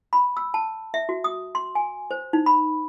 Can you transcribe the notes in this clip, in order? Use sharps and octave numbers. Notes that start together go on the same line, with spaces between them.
B5
E6
A5
E5
F#4
D#6
C6
G#5
C5
D#4
B5